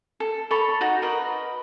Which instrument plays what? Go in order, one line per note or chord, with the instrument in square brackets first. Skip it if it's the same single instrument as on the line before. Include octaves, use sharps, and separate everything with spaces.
[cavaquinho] A4
A4 C#5 B5 C#6
D#4 F#4
A#4 B4 D#5